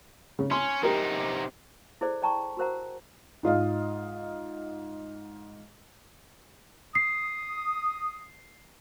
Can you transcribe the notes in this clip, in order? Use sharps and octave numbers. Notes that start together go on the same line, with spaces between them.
C#3
C#4 C6
C3 D#4 G4 A#4
E4 G#4 A4 C5 D5
D5 G5 A5 A#5 C#6
F#4 G4 A#4 C5 F#5 A#5
G#2 F4 D#5 F5
D#6 C7